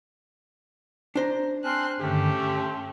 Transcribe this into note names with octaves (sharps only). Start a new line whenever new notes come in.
D4 C5 A#5
C4 G#5 A5 C6 F6 F#6
G2 D3 D#3 A3 C#4 G4
C6